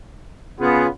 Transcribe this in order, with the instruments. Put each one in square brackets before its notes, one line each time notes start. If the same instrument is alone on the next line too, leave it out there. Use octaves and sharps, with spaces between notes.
[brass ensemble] C#3 B3 [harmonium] F4 G#4